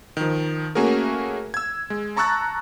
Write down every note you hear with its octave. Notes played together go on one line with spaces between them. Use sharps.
D#3 F3
A3 A#3 C#4 F#4 G#4 A#4
E6 G#6
G#3
A5 A#5 C#6 E6 F#6 A6